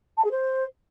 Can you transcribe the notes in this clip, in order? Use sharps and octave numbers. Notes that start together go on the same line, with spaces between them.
A5
G#4
C5